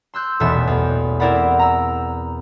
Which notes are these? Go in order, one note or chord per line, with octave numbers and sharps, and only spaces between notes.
C6 E6 F#6 G6
D#1 A1 E2 B2 A4 E5
E2
C4 E4 A#4 D5 F#5 B5
A#5 E6